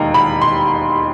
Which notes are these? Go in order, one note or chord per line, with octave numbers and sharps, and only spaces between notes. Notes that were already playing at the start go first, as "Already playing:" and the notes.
Already playing: E1 D#2 D#3 A#5
B5
C6